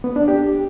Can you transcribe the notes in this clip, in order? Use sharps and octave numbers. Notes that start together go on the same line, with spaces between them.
B3
D4
G4